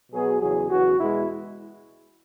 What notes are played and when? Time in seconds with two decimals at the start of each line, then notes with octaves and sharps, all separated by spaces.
0.12 B2 F#3 B3 G#4
0.41 E2 C#3 F#3 G#4
0.69 E2 C#3 F#3 B3 F#4
0.98 E2 B2 G#3 B3 E4